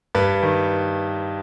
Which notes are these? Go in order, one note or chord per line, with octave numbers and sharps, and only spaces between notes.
G2 B4
D#3